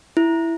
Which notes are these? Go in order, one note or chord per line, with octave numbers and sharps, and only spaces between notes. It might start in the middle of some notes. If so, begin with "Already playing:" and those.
E4